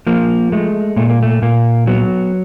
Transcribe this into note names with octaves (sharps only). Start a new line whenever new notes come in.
F3 A#3
G#3 A3
A#2 A3
A#3
A3
A#2 A#3
F#3 B3